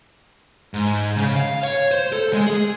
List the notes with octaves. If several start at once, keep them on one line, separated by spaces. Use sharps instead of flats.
G#2
C#3
F5
C#5
C5
A4
G#3
G#4